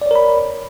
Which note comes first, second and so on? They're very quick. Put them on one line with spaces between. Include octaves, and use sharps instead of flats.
D5 C#5 A#4 B5